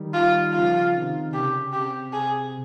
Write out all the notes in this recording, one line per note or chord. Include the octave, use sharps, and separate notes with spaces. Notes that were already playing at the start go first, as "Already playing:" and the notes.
Already playing: D#3 G3
F4
C#3 F3 F4
C3 D#3
C#3 G4
C3 G4
G#4